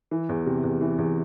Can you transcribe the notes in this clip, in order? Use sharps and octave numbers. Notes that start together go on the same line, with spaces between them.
E3
E2
C3
E2
E3
E2